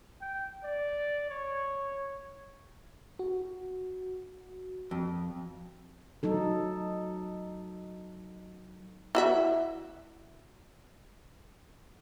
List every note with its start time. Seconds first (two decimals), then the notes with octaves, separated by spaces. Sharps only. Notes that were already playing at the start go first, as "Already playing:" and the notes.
0.21 G5
0.64 D5
1.30 C#5
3.19 F#4
4.91 F2
6.23 F#3 D#4 A4
9.15 E4 F#4 E5